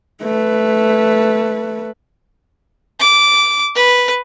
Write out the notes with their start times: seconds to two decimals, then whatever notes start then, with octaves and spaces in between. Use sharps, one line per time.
0.22 A3 B4
3.00 D6
3.76 B4